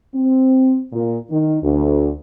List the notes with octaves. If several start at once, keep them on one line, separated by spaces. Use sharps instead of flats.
C4
A#2
D#3
D2